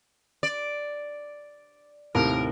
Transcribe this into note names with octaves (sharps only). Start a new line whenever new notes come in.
D5
D#2 A2 C3 A#4